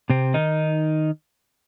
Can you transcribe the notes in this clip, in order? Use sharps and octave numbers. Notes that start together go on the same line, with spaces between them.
C3 C4
D#3 D#4